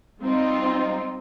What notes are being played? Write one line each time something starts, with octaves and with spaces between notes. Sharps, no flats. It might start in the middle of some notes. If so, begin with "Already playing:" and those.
G3 C4 D#4 F4